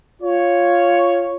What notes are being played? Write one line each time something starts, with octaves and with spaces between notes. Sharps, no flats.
F4 C#5